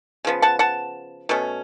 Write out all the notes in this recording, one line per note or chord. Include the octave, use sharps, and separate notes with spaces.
C#3 F3 B3
F#5 A5
F#5 A5
B2 A3 C#4